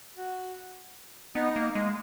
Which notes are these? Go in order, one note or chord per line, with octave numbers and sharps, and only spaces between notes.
F#4
B3 D#4
A#3
G#3